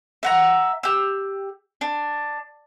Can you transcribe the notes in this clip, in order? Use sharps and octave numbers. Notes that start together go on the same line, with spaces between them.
E5 F#5 A#5
G4 E6
D4